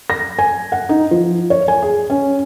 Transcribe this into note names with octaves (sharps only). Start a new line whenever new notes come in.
A#6
G#5
F#5
D#4
F3
C#5
G#5
G#4
C#4